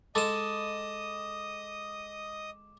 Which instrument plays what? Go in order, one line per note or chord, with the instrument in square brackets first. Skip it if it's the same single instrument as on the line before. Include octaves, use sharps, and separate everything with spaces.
[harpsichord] G#3 A4 [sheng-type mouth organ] D#5 D#6 [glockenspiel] D6 E7